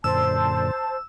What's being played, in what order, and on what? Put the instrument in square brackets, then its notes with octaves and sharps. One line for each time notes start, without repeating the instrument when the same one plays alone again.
[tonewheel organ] F#2 A#2 D3 [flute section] C5 A5 [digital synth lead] E6